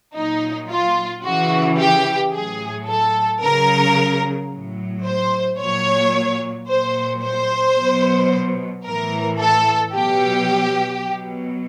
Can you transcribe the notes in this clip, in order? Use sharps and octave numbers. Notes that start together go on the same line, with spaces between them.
A#2 F#3 D#4
F4
C#3 E3 F#4
G4
A2 F#3 G#4
A4
C#3 F#3 A#4
A2 F#3
C5
A#2 F#3 C#5
A#2 F#3 C5
C5
B2 F#3
A2 E3 A#4
A4
B2 F#3 G4
B2 F#3